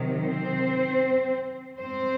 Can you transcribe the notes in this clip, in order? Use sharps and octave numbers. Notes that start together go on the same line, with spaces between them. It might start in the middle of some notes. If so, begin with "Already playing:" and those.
Already playing: C3 D#3 F#3
C4 C5
C4 C5